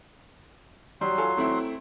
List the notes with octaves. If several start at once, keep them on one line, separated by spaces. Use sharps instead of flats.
F#3 G3 C6
F4 A4 G#5
A3 C4 E4